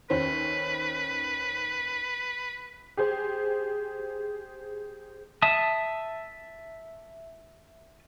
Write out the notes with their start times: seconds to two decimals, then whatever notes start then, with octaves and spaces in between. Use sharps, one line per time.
0.10 D#2 C#4 B4 C5
2.97 G4 G#4 C5
5.42 E5 A5 D#6